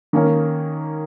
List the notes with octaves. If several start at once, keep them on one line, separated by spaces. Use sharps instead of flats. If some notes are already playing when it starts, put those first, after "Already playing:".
D#3 A#3 C#4 A#4